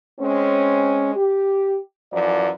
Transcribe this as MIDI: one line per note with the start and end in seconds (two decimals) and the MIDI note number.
0.18 1.11 56
0.18 1.11 60
0.18 1.11 61
1.16 1.76 67
2.10 2.47 42
2.10 2.47 52
2.10 2.47 53
2.10 2.47 74